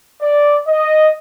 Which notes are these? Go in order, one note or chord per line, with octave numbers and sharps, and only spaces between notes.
D5
D#5